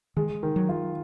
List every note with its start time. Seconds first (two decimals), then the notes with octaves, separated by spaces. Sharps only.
0.17 D#3 G#3
0.43 D#3
0.56 F#3
0.69 F4